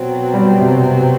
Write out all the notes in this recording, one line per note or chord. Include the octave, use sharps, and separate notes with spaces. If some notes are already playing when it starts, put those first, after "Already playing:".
Already playing: B2 F#3 C4
G3
C3
C3